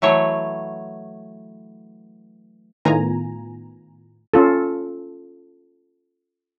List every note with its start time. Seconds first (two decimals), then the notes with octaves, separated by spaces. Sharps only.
0.02 E3 F#3 A3 C#5
2.85 A2 D#3 B3 F4 G#5 A#5
4.34 C#4 F4 A4